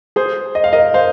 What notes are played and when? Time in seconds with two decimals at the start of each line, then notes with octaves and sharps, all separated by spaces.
0.16 G#4 C5
0.55 D#5
0.64 F5
0.73 A#4 D#5
0.94 C5 F5